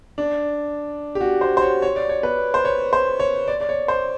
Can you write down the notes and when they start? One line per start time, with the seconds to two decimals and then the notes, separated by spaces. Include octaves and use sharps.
0.18 D4
1.15 G4
1.21 F#4
1.41 C5
1.57 C5
1.62 C#5
1.82 C#5
1.96 D5
2.09 C#5
2.23 B4
2.54 C5
2.65 C#5
2.93 C5
3.20 C#5
3.48 D5
3.61 D5
3.69 C#5
3.88 C5